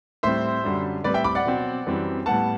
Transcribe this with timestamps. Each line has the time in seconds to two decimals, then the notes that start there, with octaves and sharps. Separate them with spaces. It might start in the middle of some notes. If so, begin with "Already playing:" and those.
0.23 A2 G3 C4 C5 E5
0.64 F#2 D3 G3
1.04 A2 G3 C4 B4 D5
1.14 E5 G5
1.24 B5 D6
1.35 D5 F#5
1.46 B2 F#3 C4
1.86 F#2 E3 G3 C4
2.26 A2 G3 B3 F#5 A5